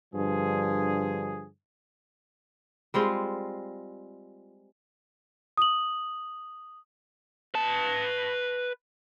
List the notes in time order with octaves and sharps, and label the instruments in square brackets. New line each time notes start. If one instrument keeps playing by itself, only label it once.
[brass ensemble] G2 D3 F3 G#4
[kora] G3 G#3 C4 F4
[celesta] D#6 F#7
[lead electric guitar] B4 A5